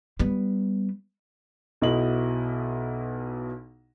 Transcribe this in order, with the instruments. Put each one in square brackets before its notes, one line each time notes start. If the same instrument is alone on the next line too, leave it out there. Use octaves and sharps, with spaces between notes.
[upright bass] G3 B3
[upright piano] B1 B2 E4 D#5 E5 F#7